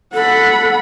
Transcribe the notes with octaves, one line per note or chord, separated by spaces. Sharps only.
A4 F#5 B5